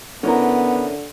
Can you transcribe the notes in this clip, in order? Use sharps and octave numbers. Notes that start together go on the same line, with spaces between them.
D3 B3 C#4 E4 A#4